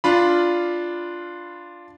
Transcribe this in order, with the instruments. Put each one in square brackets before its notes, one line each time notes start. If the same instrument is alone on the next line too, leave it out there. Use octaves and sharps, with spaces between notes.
[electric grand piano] D4 F4 B5